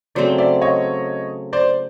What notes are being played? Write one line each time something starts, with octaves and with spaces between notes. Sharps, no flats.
C#3 F#3 A3 C4 C5 D5
D5 E5
C#5 D#5
C5 D5